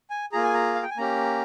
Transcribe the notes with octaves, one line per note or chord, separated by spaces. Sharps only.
G#5
A#3 F4 G#4 A#5
G#5
A#5
F5
G5
G#5
A#3 C#4 G4 A#5